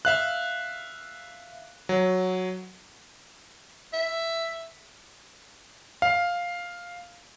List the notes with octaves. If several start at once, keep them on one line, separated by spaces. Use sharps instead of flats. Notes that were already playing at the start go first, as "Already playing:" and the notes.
E5 F5 F#6
F#3
E5
F5